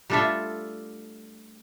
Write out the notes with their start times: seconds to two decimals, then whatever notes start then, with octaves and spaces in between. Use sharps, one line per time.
0.10 G3 A3 D4 F4 A4 E5